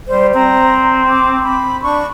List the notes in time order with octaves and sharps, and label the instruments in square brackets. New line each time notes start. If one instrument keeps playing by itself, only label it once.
[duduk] G3 [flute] C5
[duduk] C4 [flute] A#5
[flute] D6
B5
[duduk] D4 [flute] C#6